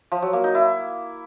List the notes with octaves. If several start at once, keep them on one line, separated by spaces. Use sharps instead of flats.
F3
F#3
A#3
D#4
E4